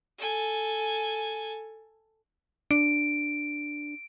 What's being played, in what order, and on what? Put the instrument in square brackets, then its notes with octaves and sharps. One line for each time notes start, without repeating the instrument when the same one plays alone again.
[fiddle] A4 G#5
[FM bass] D4 [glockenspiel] D7